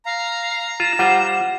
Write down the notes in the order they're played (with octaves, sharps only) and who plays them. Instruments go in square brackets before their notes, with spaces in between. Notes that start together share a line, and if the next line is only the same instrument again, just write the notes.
[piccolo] F5 [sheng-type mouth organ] A#5
[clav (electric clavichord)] F4 [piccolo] E7
[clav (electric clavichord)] G3 F4 C5 [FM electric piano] F#5